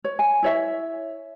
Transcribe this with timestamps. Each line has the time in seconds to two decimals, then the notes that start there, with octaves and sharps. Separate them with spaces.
0.04 C#5
0.19 G#5
0.43 E4 C#5 E5